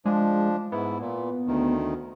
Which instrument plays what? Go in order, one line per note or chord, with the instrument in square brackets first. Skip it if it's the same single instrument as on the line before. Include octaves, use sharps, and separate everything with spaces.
[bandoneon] F3 D4 [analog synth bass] G#3
[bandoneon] G#2 E4 [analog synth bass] B3
[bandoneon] A#2
D2 D#3